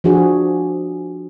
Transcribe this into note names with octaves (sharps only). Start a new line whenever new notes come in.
F3 D4 F#4 G#4